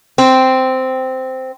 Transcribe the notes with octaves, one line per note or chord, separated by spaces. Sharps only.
C4